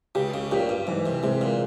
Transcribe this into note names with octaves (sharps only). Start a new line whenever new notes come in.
C#2 C#3 G4
C#2 C#3
A#1 A#2 G4
G2
G#2 E3
C2 C3
C2 C3 G#3
A#2